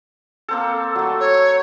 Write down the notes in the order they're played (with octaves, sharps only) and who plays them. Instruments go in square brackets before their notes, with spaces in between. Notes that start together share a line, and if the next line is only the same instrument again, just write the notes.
[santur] A#3 C4 A4
F#3 A3
[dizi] C#5